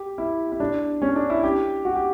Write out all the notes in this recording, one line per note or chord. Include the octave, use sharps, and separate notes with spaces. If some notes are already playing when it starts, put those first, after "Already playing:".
Already playing: G4
E4
E4
D4
C#4
D4
E4
G4
F#4
G4